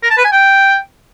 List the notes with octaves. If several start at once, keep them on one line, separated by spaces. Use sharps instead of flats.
A#4
A5
B4
G#5
G5